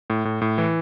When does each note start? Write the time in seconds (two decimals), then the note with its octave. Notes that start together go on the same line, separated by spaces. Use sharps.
0.10 A2
0.25 A2
0.42 A2
0.58 E3